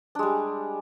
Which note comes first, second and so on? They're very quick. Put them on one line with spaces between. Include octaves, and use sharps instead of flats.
D4 G#3 G3